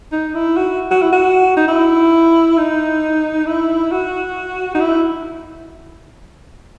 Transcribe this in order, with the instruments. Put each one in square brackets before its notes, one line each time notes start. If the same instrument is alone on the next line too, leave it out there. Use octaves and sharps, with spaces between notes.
[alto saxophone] D#4
E4
F#4
F#4
E4
F#4
D#4
E4
D#4
E4
F#4
D#4
E4